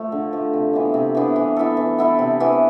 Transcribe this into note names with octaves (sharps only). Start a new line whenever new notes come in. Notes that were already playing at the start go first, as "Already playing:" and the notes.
Already playing: F3 A3
D3
F3 A3
C3
E3 B3 D4
C3
E3 B3 D4
E3
B3 E4 A4
E3
B3 E4 A4
C3
E3 B3